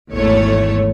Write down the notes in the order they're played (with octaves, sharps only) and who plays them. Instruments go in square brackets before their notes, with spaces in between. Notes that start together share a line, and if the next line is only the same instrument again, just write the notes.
[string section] G#1 E2 A3 C#5